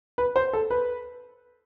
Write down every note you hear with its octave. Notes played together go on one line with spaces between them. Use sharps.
B4
C5
A4
B4